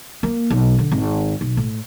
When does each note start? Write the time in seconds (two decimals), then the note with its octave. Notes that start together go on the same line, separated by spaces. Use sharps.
0.23 A#3
0.50 B1
0.78 D3
0.91 G#1
1.41 B1
1.57 A2